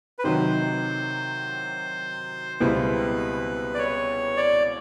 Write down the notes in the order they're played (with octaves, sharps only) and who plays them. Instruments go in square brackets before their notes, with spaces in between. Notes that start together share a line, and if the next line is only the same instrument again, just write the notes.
[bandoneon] B4
[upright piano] C3 D#3 F#3 [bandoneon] C5
[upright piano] C#2 B2 G3 C4 E4 [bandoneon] B4
[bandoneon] D5
C#5
D5